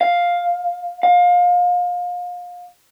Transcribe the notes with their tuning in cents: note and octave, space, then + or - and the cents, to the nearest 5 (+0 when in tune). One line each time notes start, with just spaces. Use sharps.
F5 +5
F5 +30